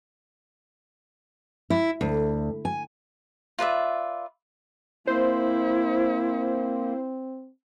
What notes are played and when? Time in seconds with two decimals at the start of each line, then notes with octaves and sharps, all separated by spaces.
1.70 E4
2.01 D2
2.65 G#5
3.59 F4 B4 D5 E5
5.07 A#3 C4 E4 C5